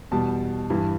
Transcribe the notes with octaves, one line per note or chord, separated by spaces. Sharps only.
E2 B2 G3 A5
G2 E3 G3